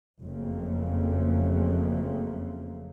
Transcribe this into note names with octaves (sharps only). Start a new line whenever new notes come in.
F#1 F2 C#3 A3 A#3